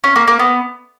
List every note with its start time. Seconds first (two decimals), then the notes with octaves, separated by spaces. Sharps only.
0.04 C#4
0.16 A#3
0.28 A#3
0.39 B3